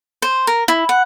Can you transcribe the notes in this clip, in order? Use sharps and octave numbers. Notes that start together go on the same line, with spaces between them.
C5
A#4
E4
F#5